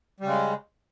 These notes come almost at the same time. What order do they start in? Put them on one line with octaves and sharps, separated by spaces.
G3 C#3 G#3